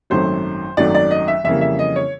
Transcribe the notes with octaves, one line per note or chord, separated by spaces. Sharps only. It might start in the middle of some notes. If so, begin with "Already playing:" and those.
G#1 F#2 D#3 F#3 A3 C5
G#1 F#2 D#3 F#3 A3 D5
D5
D#5
E5
F2 C#3 E3 G3 A#3 E5
E5
D#5
C#5